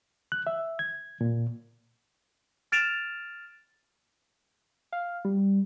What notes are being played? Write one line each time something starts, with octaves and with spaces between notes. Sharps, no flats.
F#6
E5
G#6
A#2
F6 A6 D7 E7 F7
F5
G3